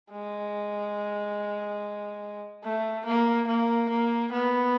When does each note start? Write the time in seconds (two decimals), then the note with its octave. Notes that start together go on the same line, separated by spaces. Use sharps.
0.12 G#3
2.64 A3
3.05 A#3
3.48 A#3
3.89 A#3
4.32 B3